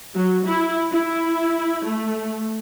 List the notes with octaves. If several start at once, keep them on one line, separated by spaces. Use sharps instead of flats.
F#3
E4
E4
A3